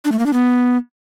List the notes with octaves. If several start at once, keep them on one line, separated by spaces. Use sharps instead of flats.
D4
A3
A#3
D4
B3